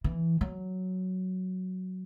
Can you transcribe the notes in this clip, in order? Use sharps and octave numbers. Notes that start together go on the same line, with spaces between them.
E3
F#3